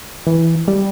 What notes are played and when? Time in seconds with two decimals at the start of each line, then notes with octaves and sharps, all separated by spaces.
0.27 E3
0.68 G3